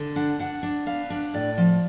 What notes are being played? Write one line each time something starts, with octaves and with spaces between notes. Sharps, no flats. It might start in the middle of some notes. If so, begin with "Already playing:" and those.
Already playing: D3
D4 F#5
D4 F#5
D4
B3 F5
D4
A2 D5
F3